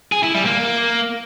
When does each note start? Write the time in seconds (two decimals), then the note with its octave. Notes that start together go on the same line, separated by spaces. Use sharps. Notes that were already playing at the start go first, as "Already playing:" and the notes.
0.12 G#4
0.23 E4
0.34 G3
0.45 A#3